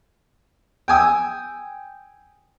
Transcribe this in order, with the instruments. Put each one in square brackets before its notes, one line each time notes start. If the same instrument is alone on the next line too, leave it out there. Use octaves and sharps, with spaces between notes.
[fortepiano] G5 G#5 D#6 E6